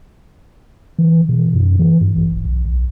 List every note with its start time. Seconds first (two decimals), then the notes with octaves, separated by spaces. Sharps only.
0.98 E3
1.29 B2
1.54 F#2
1.79 E3
2.01 G2
2.16 A1
2.33 D1
2.45 B1
2.65 B1